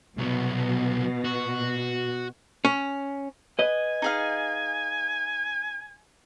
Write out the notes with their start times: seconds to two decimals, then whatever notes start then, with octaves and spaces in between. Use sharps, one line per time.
0.18 C2 B2 F#3
1.24 F#4
2.65 C#4
3.59 B4 D#5 G#5
4.02 D#4 G#4 F5